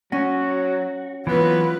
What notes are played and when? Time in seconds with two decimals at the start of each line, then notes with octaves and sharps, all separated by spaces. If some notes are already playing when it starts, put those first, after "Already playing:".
0.12 F#3 C#4 F#4
1.27 E3 F#3 B3 F4 B4